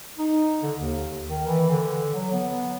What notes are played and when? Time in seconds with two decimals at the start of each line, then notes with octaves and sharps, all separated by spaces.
0.18 D#4
0.63 D3
0.76 D#2
1.28 D#3
1.47 E3
1.70 D3
2.14 F#3
2.33 B3